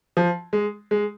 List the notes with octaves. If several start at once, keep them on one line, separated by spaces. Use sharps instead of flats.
F3
G#3
G#3